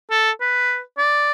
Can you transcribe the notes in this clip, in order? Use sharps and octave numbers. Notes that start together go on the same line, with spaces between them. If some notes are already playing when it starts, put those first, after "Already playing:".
A4
B4
D5